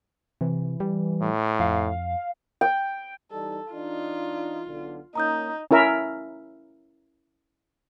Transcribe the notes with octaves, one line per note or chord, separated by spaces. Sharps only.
C3 E3
G3
A2
F2 F5
G5
E3 G3 D#4 A4
E3 D4 D#4 F4
B1 D3
A#3 C#4 D#4 A#5 D#6 G6
C#4 E4 A#4 E5